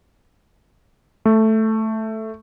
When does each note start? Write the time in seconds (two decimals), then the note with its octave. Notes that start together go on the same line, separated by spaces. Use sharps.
1.25 A3